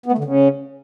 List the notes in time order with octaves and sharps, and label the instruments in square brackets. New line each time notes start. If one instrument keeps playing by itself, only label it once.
[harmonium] B3
A3
D3
C#3